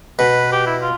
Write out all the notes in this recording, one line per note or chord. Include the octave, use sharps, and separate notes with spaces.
B2 B4
G4
E4
F4